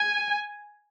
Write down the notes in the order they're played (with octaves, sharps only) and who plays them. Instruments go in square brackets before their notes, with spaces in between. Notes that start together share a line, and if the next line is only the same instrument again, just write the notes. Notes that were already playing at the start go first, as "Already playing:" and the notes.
Already playing: [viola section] G#5